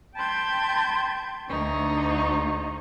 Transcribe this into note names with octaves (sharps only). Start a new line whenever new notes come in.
G5 A5 B5 C6 G6 G#6
D2 D3 D#4 C#6